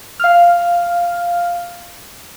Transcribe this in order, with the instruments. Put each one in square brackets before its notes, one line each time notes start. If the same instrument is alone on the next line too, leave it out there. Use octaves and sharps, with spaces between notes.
[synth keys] F5 F6